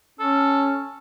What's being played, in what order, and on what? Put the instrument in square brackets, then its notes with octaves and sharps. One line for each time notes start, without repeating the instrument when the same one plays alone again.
[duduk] C#4 [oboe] A4